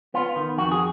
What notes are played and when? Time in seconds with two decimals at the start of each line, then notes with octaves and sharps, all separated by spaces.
0.14 B3 F4
0.36 D#3
0.58 F2 F#4
0.72 G#4